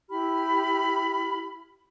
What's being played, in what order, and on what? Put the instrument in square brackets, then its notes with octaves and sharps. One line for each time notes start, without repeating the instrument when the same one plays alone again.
[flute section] E4 G4 B5 F6